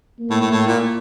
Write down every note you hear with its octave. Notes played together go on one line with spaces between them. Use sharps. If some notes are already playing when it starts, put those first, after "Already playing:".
A#3
A2
A2
A2
A#2